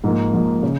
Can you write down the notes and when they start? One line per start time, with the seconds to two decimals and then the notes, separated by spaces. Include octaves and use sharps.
0.04 G#2 F3 A#3
0.33 G#2 F3 A#3
0.63 C#3